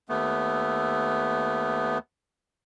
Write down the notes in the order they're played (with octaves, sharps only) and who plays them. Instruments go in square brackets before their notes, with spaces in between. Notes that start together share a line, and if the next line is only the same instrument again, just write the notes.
[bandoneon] D#2 A3 B3